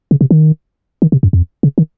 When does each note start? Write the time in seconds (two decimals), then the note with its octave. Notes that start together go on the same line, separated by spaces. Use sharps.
0.11 C#3
0.21 C3
0.31 D#3
1.02 D#3
1.12 C3
1.23 F#2
1.33 F2
1.63 C#3
1.78 D#3